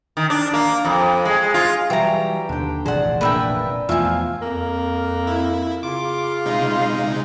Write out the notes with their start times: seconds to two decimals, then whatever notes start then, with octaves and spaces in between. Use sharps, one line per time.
0.17 D#3
0.30 D4
0.54 A#3
0.85 F2
1.25 G#3
1.54 F4
1.90 E3 F#3 G3 G4 A#5
2.49 D#2 D3 G5
2.86 F1 A#1 E3 G#4 C5 D5 F#5
3.21 A#2 D4 A#4 B4 E5 G5
3.89 E2 F3 A3 B3 C4 F4 E5 G#5
4.42 F2 A#3
5.27 E4
5.83 C#3 F4 D6
6.46 C3 G#3 D#4